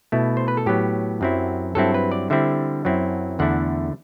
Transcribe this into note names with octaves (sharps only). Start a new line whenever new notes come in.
B2 A3 E4
C5
B4
A4
A2 F#3 B3 G4
F#2 F#3 C4 E4
G2 F#3 C4 E4 A4
B4
D5
D3 G3 C4 E4 E5
F#2 F#3 C4 E4
E2 D3 A3 E4 F#5